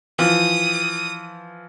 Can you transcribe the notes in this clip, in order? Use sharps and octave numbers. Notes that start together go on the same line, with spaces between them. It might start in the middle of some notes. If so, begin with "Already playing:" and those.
E3 F3 D#6